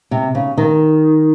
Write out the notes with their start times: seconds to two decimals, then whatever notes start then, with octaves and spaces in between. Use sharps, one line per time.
0.11 C3
0.35 C#3
0.58 D#3